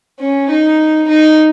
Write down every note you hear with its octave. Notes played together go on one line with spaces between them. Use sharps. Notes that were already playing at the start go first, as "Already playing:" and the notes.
C#4
D#4
D#4